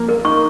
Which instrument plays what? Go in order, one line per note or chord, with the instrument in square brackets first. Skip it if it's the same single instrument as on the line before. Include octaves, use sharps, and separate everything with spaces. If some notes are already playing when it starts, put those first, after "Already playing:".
Already playing: [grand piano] F3 A#3
[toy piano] A#4
[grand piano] D#4 [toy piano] C#6